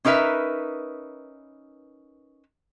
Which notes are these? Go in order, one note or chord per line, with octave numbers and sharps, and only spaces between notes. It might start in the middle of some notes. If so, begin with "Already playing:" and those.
C#4 D#4 A#4 B4 E5